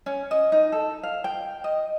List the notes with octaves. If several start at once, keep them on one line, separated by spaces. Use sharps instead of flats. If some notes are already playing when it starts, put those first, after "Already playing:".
C#4
D#5
D#4
A4
F5
G5
D#5